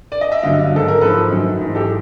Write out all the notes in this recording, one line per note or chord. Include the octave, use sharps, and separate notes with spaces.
D5
D#5
E5
G2 D3 F#3 D#5 F5
G#2 D#3 F#3 A4
A#4
G#2 F3 A4 B4
F#2 D#3 F#3
G#2 E3
G4 A4